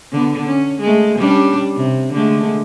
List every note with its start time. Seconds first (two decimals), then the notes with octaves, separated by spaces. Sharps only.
0.12 D3 B3
0.47 C#4
0.81 G#3 A3
1.18 G3 C#4 D4
1.76 C3
2.13 D3 G#3 A3